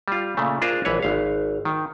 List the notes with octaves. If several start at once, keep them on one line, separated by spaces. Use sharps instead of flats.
G3 F4
A#2 C#3 A3
D4 F4 G#4 A#4 C5
A#1 E3 B4 C#5
G#1 F5
D#3